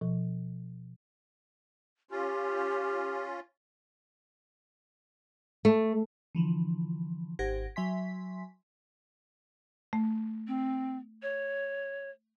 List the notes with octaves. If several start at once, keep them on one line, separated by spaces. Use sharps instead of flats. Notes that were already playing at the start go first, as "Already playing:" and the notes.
B2 F3
C#4 F4 G4
A3
D3 E3 F3
G#1 G4 C5 F#5 G#6 A#6
F#3 E5 G#5 C6 B6
A3
C4
C#5